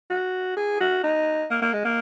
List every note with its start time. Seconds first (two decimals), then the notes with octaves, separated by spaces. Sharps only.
0.10 F#4
0.57 G#4
0.81 F#4
1.04 D#4
1.51 A#3
1.62 A#3
1.74 G#3
1.85 A#3